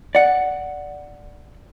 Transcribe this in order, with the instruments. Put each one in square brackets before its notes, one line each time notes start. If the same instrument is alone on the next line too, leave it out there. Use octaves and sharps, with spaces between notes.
[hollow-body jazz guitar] D5 F#5